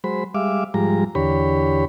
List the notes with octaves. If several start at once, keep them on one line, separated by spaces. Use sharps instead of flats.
F#3 G#3 C5 B5
G3 G#3 E5 F5 D6
G#2 F3 G3 G#3 A#5
E2 D3 G4 C#5 B5